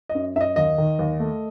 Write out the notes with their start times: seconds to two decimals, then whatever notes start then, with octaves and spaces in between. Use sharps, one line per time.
0.09 D#5
0.15 F#2
0.36 F#2 E5
0.41 D#5
0.56 D#2 D#5
0.78 D#3
0.99 D#2
1.20 A3